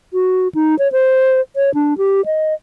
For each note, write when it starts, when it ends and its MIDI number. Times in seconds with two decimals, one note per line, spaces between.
0.13 0.48 66
0.55 0.78 63
0.79 0.91 73
0.92 1.41 72
1.56 1.73 73
1.74 1.97 62
1.98 2.25 67
2.26 2.54 75